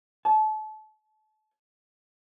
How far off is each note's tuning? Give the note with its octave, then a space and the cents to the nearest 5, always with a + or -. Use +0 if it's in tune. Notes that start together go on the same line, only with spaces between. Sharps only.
A5 -30